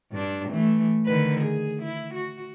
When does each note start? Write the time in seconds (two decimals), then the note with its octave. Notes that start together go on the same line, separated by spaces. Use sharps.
0.12 G2 D4
0.49 E3 A3
1.06 D3 D#3 B4
1.41 G#4
1.83 E4
2.15 F#4